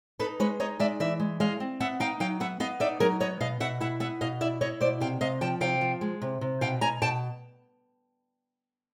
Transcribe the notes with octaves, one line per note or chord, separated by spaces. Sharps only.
D#4 A4 B4
G#3 B4 C#5
D#4 C#5 D#5
G#3 D5 E5
E3 D5 E5
G#3
G#3 D#5 F5
C4
B3 E5 F#5
D#4 F5 G5
F#3 F5 G5
B3 E5 F#5
B3 D#5 F5
D#4 D5 E5
F#3 G#4 A#4
B3 C#5 D#5
B2 D#5 F5
B2 E5 F#5
E4 E5 F#5
B3 E5 F#5
B2 D#5 F5
E4 D5 E5
E4 C#5 D#5
B2 C5 D5
C3 F5 G5
C3 D#5 F5
F3 G5 A5
C3 F5 G5
F3
G#3
C3
C3
B2 F5 G5
B2 G#5 A#5
B2 G5 A5